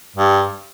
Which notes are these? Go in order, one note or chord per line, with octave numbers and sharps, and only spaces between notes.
G2